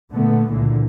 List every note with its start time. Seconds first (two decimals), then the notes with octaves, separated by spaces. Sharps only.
0.13 A#2 D3 A3 B3
0.51 C#2 A#2 D3 E3